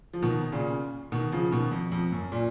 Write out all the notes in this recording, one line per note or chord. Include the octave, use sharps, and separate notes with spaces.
F3
B2 D#3
A#2 C#3
B2 D#3
C#3 F3
B2 D#3
F2
F2
F#2
A#2